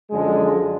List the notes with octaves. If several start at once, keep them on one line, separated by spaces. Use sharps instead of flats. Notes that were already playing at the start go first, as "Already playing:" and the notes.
F#2 D3 F3 G#3